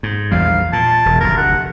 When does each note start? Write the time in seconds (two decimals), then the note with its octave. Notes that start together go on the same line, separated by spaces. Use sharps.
0.03 G#2
0.32 A#1 E2 G3 F5
0.73 A#2 A5
1.06 E1
1.20 F1 D2 A#4
1.37 F#5